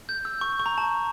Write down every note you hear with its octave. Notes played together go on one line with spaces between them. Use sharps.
G6
E6
C#6
C#6
A#5
A5